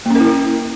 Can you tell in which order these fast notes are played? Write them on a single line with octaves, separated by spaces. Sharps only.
A#3 C#4 A#4 E4